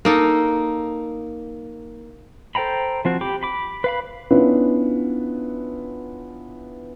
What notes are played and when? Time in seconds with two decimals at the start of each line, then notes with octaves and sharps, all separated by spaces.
0.05 A#3 D#4 A4
2.55 A4 C5 G5 A#5 B5
3.05 F3 C4 F#4
3.21 G4 B5 D6
3.43 B5 D6
3.84 B4 F5 B5
4.31 B3 C#4 D4 E4 F4